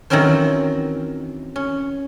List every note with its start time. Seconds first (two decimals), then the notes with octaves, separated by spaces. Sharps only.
0.10 D#3 E3 F#3 C4 C#4 C5
1.56 C#4